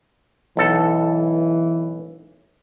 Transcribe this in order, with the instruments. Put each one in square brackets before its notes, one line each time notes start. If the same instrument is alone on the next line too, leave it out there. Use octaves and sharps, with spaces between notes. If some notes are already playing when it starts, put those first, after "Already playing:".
[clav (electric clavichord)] B1 A4 [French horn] E3